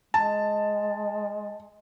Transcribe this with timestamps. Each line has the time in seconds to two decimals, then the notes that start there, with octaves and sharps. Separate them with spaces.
0.14 G#3 A5